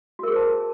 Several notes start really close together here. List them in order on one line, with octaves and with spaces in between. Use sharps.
F#4 A#4 G#4 C5 A5